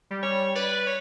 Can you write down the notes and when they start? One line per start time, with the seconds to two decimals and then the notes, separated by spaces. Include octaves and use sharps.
0.11 G3
0.23 C#5
0.55 B4 D5
0.87 C#5